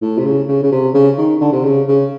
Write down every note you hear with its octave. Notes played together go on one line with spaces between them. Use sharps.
A2
C3
C#3
C#3
C#3
C3
C#3
D#3
D3
C3
C#3
C#3